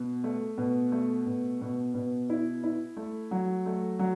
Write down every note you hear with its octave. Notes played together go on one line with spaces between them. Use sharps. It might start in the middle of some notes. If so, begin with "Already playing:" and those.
Already playing: B2
A3
B2
A3
B2
B2
B2
E4
E4
A3
F#3
A3
F#3